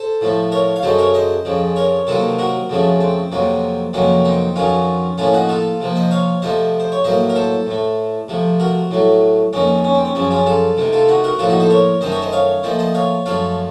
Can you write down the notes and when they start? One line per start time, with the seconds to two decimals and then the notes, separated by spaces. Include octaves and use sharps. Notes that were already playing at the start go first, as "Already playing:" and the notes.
Already playing: A4 C5
0.21 A2 F3 A3
0.52 A#4 C#5
0.76 F5
0.83 F#2 C#3 F#3 A3 C5 D#5
0.98 A#4 C#5
1.14 C5 D#5
1.45 F2 C#3 F3
1.76 A#4 C#5
2.07 C3 D#3 F#3 A#3 A4 C5
2.39 F#4 A#4
2.69 F2 C#3 F3 A3
3.00 C4
3.32 F2 C3 F#3 A#3
3.93 F2 C3 D#3 F#3 A#3 C#4
4.25 C4 D#4
4.56 F2 D#3 F#3 C#4 F4
5.18 A2 F3 A#3 C#4 F4
5.33 D#4 F#4
5.49 F4 A4
5.80 C3 F3 A#3
5.96 C5 D#5
6.11 C#5 F5
6.42 C3 F3 A3 C5 D#5
6.80 C5
6.92 C#5
7.04 A2 F#3 A#3 C5 D#5
7.30 A#4
7.36 A4 C5
7.66 A2 A3
8.28 C3 F3 A3
8.60 F#4 A#4
8.91 A2 F#3 A3
9.53 F2 D#3 A#3 C#4
9.84 C#4
9.95 C4
10.05 C#4
10.15 F#2 C#3 F3 C#4
10.31 C#4 F4
10.46 F4 A4
10.77 C3 D#3 A3
10.92 F4 A4
11.08 D#4 F#4
11.24 F#4 A#4
11.39 A2 F3 A#3 F4 A4
11.49 D#4 F#4
11.60 A4 C5
11.70 A#4 C#5
12.01 F#2 D#3 A3 C5 D#5
12.12 A#4 C#5
12.22 C5 D#5
12.32 C#5 F5
12.63 A#2 F3 A3 C5 D#5
12.79 C5 D#5
12.95 C#5 F5
13.26 F#2 F3 A3 C#5 F5